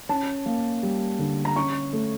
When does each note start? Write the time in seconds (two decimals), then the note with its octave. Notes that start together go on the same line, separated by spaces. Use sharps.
0.09 C#4 A5
0.46 A#3
0.83 G3
1.19 D3
1.45 A#5
1.56 C#4 C#6
1.93 A3